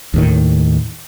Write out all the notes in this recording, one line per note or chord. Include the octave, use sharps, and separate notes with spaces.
D#2 A2 D#3